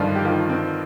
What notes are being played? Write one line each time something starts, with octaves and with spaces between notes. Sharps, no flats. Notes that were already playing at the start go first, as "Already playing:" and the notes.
Already playing: G2 D3 D#3 F3 F4
G4
D#3 F3 F4
C4